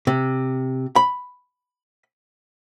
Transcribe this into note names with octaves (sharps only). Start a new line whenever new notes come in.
C3
B5